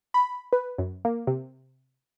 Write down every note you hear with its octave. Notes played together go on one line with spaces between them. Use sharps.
B5
B4
F#2
A#3
C3